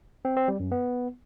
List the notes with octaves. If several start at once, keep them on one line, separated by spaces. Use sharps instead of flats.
C4
C4
G3
F#2
B3